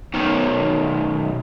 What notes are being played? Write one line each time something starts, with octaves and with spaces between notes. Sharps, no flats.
B1 D#3